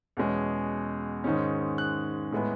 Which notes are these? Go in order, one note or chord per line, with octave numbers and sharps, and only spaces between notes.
E2 B2 G#3 C#4
G#2 D#3 G#3 C#4
F#6
A2 G#3 B3